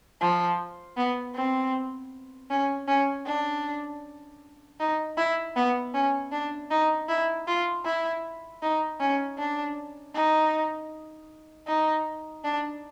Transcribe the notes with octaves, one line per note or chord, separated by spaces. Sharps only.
F3
B3
C4
C#4
C#4
D4
D#4
E4
B3
C#4
D4
D#4
E4
F4
E4
D#4
C#4
D4
D#4
D#4
D4